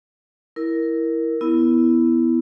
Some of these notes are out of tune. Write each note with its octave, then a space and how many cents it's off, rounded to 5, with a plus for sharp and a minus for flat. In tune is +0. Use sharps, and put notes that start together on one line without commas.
E4 +0 A#4 +0
B3 +5 E4 +0